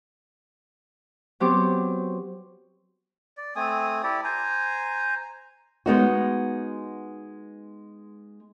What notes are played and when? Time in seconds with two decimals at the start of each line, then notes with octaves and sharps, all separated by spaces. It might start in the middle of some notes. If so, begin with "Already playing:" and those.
1.40 F#3 B3 C4 G4 C5 D6
3.37 D5
3.56 A3 C4 G#5 D#6
4.03 E4 G4 A4 D5
4.24 C5 G#5 A#5
5.86 G#3 B3 D#4 F#4